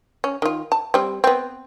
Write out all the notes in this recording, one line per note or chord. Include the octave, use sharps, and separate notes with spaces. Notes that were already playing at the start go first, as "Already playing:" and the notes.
C#4
D#3 F4
A5
G3 C4
B3 C4